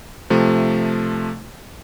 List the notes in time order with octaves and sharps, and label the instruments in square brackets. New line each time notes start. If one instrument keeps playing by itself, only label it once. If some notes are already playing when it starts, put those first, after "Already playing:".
[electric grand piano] C3 F3 A3